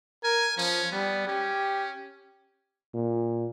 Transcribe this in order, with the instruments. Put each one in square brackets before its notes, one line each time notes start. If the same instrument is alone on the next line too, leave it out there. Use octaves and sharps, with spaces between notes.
[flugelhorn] A#4 [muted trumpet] G#5
[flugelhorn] F3 [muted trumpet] C#4
[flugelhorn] G3 [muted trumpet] B3
[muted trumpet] C#4 [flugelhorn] G4
[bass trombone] A#2